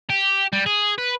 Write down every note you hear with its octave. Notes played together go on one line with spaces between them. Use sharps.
G4
G3
G#4
B4